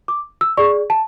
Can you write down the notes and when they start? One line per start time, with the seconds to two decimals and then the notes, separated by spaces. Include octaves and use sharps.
0.08 D6
0.41 E6
0.57 G#4 D5 C#6
0.90 A5